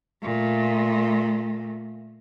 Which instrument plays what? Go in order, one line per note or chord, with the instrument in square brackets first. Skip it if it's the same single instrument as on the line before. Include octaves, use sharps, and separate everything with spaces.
[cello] A#2 A3